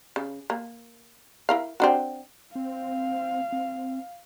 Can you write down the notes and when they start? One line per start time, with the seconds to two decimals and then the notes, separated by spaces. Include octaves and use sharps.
0.16 C#3
0.50 A#3
1.49 E4 A#4 F5
1.80 C4 D4 F#4
2.55 C4 F5
3.52 C4